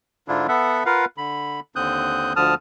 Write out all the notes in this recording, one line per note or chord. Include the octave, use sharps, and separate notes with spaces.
G#2 D3 D4 E4 F4
B3 A4 E5 F#5
F4 A#4 B4 F5 F#5
D3 B5
D#2 D3 C4 D#6 F#6 G6
D2 D3 F3 A5 D#6 F6